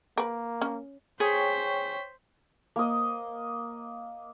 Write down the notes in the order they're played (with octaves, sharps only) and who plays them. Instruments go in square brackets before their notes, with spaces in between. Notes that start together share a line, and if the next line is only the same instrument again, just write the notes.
[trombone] A#3 [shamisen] A#4 B4
[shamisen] C#4
[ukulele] G#4 [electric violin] C5 B6 [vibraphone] C#5 G5 C#6
[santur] A#3 D#5